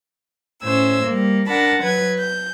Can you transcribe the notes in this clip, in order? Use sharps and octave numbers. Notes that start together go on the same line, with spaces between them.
A2 C#4 C5 E6 G#6
G3 A#3
D4 A#4 F#5 A5 B5
F#3 B4 G#6
G6